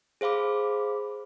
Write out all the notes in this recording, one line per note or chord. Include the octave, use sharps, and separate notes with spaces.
G#4 C5 F5 B5 D6